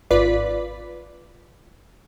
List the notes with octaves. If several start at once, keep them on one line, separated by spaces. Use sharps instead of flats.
G#1 F4 B4 D5 B6